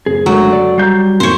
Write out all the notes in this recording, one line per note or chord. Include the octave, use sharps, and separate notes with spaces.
F#1 G#4
D3 F#3 G#3 A3
A4 D5
G3 A#5 G6 C7
G#1 F2 C5 C#5